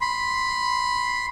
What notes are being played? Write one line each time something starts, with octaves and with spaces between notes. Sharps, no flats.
B5 C6